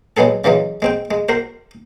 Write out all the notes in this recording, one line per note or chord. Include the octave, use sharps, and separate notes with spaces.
F#3 G#3 B3 G#4 A4
C#3 E3 F#3 G#3
G#3 C4 G5
G#3
F#4 A#4 C5